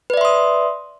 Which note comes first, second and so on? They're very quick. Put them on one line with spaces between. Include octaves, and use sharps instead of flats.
B4 D5 E5 C6 D#6